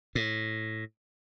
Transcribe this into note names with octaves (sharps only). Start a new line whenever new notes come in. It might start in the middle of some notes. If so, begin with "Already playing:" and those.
A2